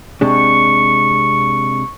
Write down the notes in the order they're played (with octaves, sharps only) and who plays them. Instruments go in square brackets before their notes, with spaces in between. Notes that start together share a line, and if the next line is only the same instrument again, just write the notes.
[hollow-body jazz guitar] C3 G#3 D4 [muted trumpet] C#6